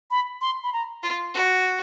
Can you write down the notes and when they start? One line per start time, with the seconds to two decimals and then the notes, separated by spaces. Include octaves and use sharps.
0.11 B5
0.41 C6
0.64 B5
0.73 A#5
1.03 F4
1.34 F#4